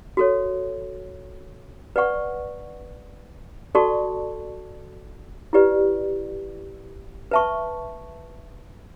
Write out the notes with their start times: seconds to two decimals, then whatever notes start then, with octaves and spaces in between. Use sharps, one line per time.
0.17 F#4 A4 C#5
1.96 B4 D5 F#5 C#6
3.75 F#4 A4 D5 A5 C#6
5.53 E4 G4 B4 D5
7.31 B4 E5 A5 C#6